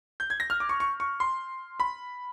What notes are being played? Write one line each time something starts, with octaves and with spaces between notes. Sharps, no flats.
G6
G#6
A#6
F6
D6
C#6
C#6
C#6
C6
B5